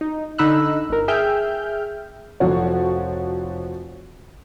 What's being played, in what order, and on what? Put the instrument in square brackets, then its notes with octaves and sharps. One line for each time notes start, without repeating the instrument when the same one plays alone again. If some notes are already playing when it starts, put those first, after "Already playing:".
[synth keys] D#4
D3 D#4 B5 E6 F#6
G1 A#4
G#4 E5 G5 F6 G6
[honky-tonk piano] F1 F3 F#4 C#5